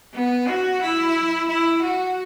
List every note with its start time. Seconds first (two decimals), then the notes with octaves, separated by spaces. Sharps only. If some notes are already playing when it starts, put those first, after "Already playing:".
0.14 B3
0.48 F#4
0.82 E4
1.49 E4
1.82 F#4